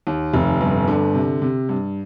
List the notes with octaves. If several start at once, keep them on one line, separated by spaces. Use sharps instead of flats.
D#2
F1
G1
D3
C3
C3
G2